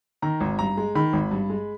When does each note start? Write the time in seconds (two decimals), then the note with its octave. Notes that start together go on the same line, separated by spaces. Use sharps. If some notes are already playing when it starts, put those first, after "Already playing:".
0.22 D#3 A#5
0.40 G#1
0.59 G2 A#5
0.77 G#3
0.95 D#3 B5
1.13 G#1
1.31 G2
1.49 G#3